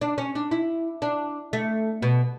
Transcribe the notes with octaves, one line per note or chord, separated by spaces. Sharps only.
D4
C#4
D4
E4
D4
A3
B2